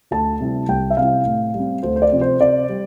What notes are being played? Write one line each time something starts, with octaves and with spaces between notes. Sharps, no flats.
D2 A5
C3 G3 C4 E4
C2 G5
E5
C3 G3 C4 E4 F5
A2
G3 C4
D2 C5
C5
D5
C3 F3 C4
C5
C3 D5
G3